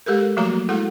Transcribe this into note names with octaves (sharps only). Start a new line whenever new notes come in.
G#3 G4 A4 A#4
F3 F#3 A3 A#3 F#4 A#5
G#3 E4 F#4 G#4 A4 F#5